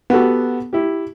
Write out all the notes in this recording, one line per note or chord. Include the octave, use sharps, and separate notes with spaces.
B3 F#4 G4 A4
E4 G4